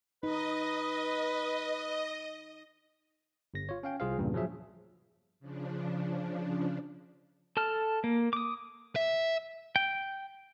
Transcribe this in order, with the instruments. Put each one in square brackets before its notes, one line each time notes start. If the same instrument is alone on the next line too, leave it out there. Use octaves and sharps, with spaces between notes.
[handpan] D#4 [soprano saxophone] B4 [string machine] D#5
[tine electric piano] G1 A#6
F4 C#5
C#4 F5 G5
C2 F4 G#4 C5 F5
E2 G2 A#2 C#3
F3 F#3 G#4 E5
[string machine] C#3 F3 D4
[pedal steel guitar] A4 A5 F6
A#3
D6 D#6
[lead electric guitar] E5
[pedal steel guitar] G5